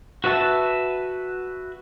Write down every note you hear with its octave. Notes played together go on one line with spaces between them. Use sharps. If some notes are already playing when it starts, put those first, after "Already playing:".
F#4 B4 E5 A5